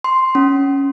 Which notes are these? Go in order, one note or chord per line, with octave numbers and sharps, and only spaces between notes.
C6
C#4